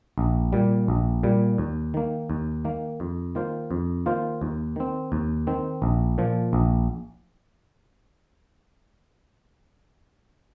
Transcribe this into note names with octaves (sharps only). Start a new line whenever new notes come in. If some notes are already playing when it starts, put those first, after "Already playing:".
A#1
A#2 G3
A#1
A#2 G3
D#2
D#3 A#3
D#2
D#3 A#3
F2
D#3 A#3 F4 C5
F2
D#3 A#3 F4 C5
D#2
D#3 C4
D#2
D#3 C4
A#1
A#2 F3
A#1